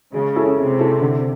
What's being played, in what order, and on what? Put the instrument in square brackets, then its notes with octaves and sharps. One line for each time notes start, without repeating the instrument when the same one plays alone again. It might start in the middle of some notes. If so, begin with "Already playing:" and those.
[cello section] C#3 [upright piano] G#3
[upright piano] C#4 E4 A4
[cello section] C3 [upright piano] G#3
[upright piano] C#4 E4 A4
D3